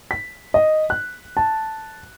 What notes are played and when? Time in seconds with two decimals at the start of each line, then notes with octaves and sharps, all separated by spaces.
0.11 B6
0.54 D#5
0.90 F#6
1.37 A5